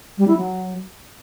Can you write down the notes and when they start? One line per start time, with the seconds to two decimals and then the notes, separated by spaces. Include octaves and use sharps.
0.18 G3
0.28 E4
0.37 F#3